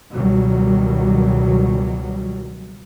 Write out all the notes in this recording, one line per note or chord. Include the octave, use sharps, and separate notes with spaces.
C#2 B2 D#3 F#3 G3